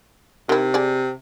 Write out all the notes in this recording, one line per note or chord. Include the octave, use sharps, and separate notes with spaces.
C3 D#3 E4
G#4 D5